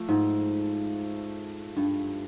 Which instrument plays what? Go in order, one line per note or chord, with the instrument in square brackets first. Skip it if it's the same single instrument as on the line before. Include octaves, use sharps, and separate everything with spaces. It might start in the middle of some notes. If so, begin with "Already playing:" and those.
Already playing: [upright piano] F3 A3
[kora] G#2
G2